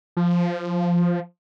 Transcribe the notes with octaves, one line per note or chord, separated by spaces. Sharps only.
F3